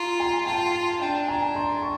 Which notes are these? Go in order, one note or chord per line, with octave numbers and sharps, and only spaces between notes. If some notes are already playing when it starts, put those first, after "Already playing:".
Already playing: F4 A#5 C6
G#5 A#5
F4 G5 A5
D4 G5 A5
G#5 A#5
A#5 C6
C#6